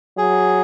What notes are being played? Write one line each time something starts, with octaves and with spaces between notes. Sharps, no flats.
F#3 G#4